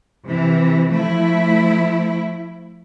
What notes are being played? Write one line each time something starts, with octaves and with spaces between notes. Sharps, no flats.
C3 E3
F3 A3 E4